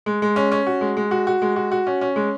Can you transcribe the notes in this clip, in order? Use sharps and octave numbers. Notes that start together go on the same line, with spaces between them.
G#3
G#3
C#4
C#4
F#4
G#3
G#3
F#4
F#4
G#3
F#4
F#4
C#4
C#4
G#3